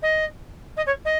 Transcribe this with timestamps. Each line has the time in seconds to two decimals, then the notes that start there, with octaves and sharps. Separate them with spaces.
0.02 D#5
0.77 D#5
0.86 C#5
1.05 D#5